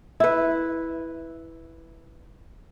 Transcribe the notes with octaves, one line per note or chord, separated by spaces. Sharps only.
E4 B4